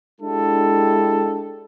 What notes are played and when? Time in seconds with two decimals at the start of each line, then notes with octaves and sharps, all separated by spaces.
0.21 G#3 D4 E4 G4 A4